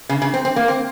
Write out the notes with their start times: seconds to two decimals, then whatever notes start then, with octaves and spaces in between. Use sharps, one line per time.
0.09 C#3
0.22 C#3
0.34 C4
0.45 C4
0.56 A#3
0.68 C4